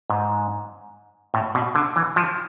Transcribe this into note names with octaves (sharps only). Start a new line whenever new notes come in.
G#2
A2
B2
D3
E3
F3